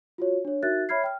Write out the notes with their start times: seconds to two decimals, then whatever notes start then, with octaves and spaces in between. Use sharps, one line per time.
0.18 F4 F#4 C#5
0.45 D4 C#5
0.63 D#4 F#4 A#4 E5 F#6 A6
0.89 C#5 E5 B5 F6 G#6 C7
1.04 G5 F6